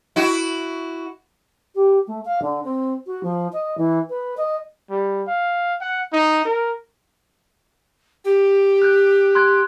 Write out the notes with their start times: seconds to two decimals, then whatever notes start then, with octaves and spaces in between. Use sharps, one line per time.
0.16 E4 F#4
1.75 G4
2.07 A3
2.25 F5
2.42 D3
2.64 C4
3.07 F#4
3.23 F3
3.53 D#5
3.78 E3
4.10 B4
4.37 D#5
4.90 G3
5.27 F5
5.81 F#5
6.12 D#4
6.45 A#4
8.25 G4
8.82 F#6 G6
9.35 C6 F#6 G#6